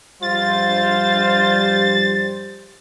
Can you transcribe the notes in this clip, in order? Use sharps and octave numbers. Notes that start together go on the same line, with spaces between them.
G2 F3 G3 F4 C5 A6